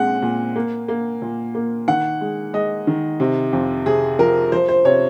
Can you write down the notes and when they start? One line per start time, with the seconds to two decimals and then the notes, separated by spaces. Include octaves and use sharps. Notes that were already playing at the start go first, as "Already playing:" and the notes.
Already playing: A#2 G#3 C4 F#5
0.22 A#2
0.56 A#3
0.88 A#3
1.22 A#2
1.55 A#3
1.88 D#3 F#5
2.21 G#3
2.53 G#3 D#5
2.87 D#3
3.20 C3
3.53 F2
3.86 C3 G#4
4.19 F3 A#4
4.52 F3 C5
4.69 C5
4.85 C3 C#5